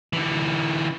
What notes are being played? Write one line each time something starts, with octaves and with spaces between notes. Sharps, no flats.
D3 E3